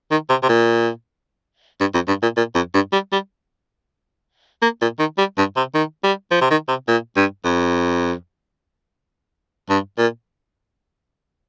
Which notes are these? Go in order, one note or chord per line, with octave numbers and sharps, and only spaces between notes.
D#3
C3
C3
A#2
G2
F2
G2
A#2
A#2
F2
G2
G3
G3
A#3
A#2
D#3
G3
G2
C3
D#3
G3
F3
C3
D#3
C3
A#2
G2
F2
G2
A#2